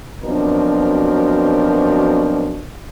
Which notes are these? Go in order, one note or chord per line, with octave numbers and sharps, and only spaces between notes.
F#2 B2 F3 C4 D4 A#4